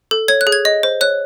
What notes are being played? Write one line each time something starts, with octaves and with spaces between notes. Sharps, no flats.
A4
C#5 G#6
F#6
G#4
G#6
D#5
C5
C#5 F#6